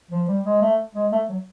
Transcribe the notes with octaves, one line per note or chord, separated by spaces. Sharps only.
F3
G3
G#3
A3
G#3
A3
F#3